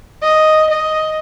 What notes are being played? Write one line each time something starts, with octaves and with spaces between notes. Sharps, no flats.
D#5
D#5